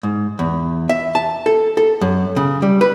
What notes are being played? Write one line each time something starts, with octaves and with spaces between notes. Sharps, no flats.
G#2
E2
E5
A5
A4
A4
F#2
C#3
G3
B4